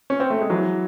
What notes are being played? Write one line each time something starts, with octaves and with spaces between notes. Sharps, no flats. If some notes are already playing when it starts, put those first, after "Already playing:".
C#4
C4
A3
G#3
E3 F#3